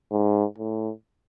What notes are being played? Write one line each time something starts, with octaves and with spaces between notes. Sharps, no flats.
G#2
A2